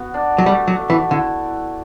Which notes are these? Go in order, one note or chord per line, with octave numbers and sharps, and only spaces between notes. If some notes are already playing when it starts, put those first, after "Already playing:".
Already playing: B3 F#4
D4
F#3
G3 A3
F#3
A3
E3
D3 E4